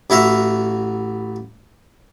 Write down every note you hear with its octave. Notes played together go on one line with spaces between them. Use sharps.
A1 E4 F#4 E5 F5